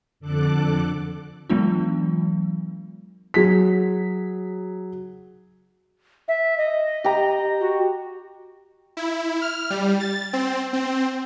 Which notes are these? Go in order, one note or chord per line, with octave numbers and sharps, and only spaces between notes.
F2 D3 A4 D6 F#6
E3 F#3 G#3 B3 D4 F4
F#3 G#4 B6
E5
D#5
G4 A#5
F#4
E4
F6
G3
A6
C4
C4